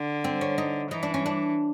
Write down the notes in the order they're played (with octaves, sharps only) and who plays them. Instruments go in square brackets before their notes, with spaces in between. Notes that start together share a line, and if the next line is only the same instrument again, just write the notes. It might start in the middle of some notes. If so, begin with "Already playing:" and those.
Already playing: [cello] D3
[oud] C4
C#4
D#4
[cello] E3 [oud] D#4
[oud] D4
C#4
D4